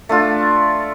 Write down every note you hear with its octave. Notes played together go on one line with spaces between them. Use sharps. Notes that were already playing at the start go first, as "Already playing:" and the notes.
A3 D4 F4